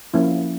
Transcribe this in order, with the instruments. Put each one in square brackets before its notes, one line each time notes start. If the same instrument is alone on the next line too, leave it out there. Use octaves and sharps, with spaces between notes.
[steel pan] F3 A#3 C#4 E4